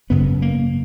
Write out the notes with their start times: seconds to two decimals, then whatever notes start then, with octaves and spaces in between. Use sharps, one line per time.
0.10 G#1 F#2 C#3 B3
0.42 A#3